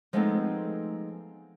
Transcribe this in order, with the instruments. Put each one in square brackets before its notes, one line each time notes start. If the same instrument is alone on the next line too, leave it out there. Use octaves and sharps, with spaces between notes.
[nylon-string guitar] F3 G#3 A3 B3 C4 D#4